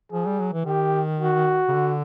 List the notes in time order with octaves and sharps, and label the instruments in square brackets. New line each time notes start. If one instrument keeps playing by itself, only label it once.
[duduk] F3 [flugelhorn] G#4
[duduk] G3
F#3
E3
[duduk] D#3 [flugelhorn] G4
[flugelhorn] F#4
[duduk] C#3
D3